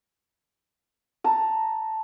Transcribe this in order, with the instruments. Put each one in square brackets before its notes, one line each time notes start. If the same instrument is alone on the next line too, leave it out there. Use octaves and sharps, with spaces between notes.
[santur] A5 A#5